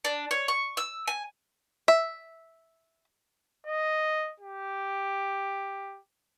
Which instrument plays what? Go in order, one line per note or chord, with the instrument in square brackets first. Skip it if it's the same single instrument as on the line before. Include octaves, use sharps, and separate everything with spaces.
[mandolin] D4
C#5
C#6
E6
G#5
[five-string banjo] E5
[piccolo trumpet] D#5
G4